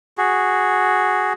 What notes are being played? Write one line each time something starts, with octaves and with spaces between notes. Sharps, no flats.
F#4 G#4